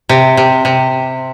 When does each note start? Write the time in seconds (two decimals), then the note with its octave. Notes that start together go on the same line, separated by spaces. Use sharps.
0.09 C3
0.37 C3
0.65 C3